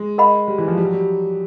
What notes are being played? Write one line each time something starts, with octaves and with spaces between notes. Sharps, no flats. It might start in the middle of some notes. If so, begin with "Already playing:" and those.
Already playing: G#3
A#4 D#5 F#5 B5
G3
E3
F3
G3
F#3
G3